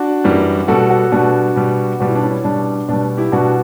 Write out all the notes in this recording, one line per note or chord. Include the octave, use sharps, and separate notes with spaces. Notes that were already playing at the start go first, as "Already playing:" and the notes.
Already playing: D4 F#4
F#2 E3 G3
B2 G3 F#4 A4
F#4 A4
B2 G3 D4 F#4
B2 G3
B2 G3 F#4
E4
D4
C#4 E4
B2 G3 D4
B2 G3 D4
E4 G4
B2 G3 D4 F#4